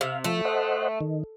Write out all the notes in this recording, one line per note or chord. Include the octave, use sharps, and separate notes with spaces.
C3 F5
F3 A3
C5 D#5 F#5
D#3